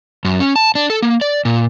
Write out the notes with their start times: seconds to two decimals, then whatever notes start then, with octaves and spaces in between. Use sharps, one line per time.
0.25 F#2
0.40 C#4
0.56 A5
0.75 D4
0.90 A4
1.02 A#3
1.21 D5
1.45 A#2